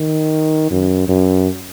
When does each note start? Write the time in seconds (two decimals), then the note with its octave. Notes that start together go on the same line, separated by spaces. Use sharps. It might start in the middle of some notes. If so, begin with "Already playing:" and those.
Already playing: D#3
0.71 F#2
1.09 F#2